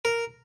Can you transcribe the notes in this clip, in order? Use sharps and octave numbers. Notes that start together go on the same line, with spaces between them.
A#4